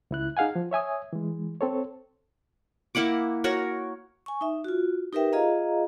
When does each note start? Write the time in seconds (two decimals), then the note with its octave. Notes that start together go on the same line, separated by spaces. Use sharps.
0.11 C#2 E4 F#6
0.37 D#4 G#4 F5 F#5 G#5
0.55 F3
0.71 C#5 E5 G#5 D#6
1.13 E3 G#3
1.61 C4 A4 C#5
2.95 A#3 E4 F#5 D6
3.44 F#4 A#4 C#5 A#5
4.26 G#5 C#6
4.41 D#4 E5
4.64 F4 F#4
5.13 D#4 G4 A#4 B4 E5 G5
5.33 F4 G#4 D#5 F5 A#5